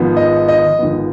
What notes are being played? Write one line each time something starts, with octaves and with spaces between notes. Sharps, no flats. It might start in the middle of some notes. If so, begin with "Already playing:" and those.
Already playing: G#1 G#2 F3 B3
D#5
D#5
G#1 G#2 F3 B3